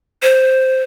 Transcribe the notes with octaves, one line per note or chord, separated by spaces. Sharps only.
C5